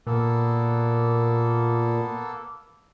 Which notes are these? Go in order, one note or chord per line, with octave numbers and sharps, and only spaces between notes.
A#2 A#3 B3 A4